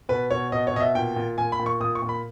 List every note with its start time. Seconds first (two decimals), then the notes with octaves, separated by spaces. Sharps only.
0.09 B2 B4
0.31 B2 C#5
0.52 B2 D#5
0.67 C#5
0.74 B2 D#5
0.81 E5
0.95 A#2 G5
1.16 A#2
1.38 A#2 G#5
1.52 B5
1.59 A#2
1.66 C#6
1.80 A#2 D#6
1.95 C#6
2.02 A#2
2.09 B5